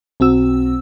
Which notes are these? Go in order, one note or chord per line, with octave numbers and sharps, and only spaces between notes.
B1 C4 F#4 E6